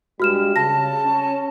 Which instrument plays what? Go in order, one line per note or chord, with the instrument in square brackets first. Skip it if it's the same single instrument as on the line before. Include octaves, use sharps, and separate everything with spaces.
[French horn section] G2 G3 G#3 [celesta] F#4 F6 E7
[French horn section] C#3 [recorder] A5 [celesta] A#6
[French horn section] C#4